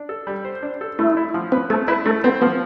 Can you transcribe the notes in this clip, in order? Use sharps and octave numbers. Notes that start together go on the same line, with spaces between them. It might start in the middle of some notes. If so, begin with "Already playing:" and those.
Already playing: D4
A4
G3
C5
D4
A4
A3 E4
E4
F3
C4 B4
A3 A4
E4 B4
A3 A4
B3 C4
F3 B3